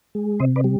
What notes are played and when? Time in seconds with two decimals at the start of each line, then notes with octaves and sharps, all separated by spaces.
0.15 G#3
0.40 C3 C5 D#5
0.56 B4 D5
0.64 G3